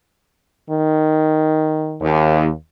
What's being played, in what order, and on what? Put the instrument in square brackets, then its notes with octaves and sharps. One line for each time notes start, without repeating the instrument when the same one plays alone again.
[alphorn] D#3
[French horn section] D#2